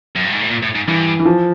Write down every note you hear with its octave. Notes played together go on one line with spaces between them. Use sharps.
F#2
G2
G#2
A2
A#2
A2
G#2
G2 E3
E3
F3